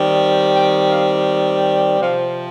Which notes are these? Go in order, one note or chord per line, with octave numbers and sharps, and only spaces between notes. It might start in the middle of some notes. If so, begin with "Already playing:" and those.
Already playing: D#3 G3 C4
G5
F5
C3 F3 C4 F5